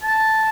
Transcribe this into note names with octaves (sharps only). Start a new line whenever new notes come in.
A5